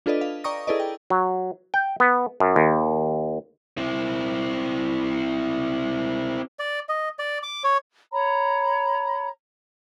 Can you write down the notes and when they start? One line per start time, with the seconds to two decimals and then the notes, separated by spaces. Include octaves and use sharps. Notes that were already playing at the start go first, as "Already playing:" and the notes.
0.06 D4 F4 A4 B4 D5 D#5
0.21 F5
0.44 D5 G5 A#5 C#6 D#6 A#6
0.67 E4 G#4 A4 B4 D5 D#5
0.80 G5
1.10 F#3
1.74 G5
2.00 B3
2.40 F#2
2.56 D#2
3.77 C4 E4
6.59 D5
6.89 D#5
7.19 D5
7.43 D6
7.64 C#5
8.12 C#5 A#5 B5